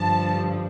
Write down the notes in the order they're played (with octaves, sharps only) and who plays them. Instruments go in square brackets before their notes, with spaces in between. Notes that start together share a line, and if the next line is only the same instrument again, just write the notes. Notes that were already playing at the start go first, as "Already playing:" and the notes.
Already playing: [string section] G2 D3 F3 A5